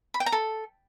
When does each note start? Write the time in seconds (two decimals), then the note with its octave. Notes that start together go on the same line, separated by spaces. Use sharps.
0.14 B5
0.20 G5
0.26 A#5
0.32 A4